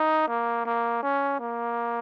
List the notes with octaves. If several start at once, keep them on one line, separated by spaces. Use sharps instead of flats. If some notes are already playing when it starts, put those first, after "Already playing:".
Already playing: D#4
A#3
A#3
C#4
A#3